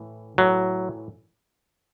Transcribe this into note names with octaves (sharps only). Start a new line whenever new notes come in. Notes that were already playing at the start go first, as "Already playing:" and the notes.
Already playing: A2 E3
A2 E3 F#3